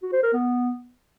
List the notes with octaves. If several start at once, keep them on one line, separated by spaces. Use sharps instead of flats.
F#4
C5
A#4
B3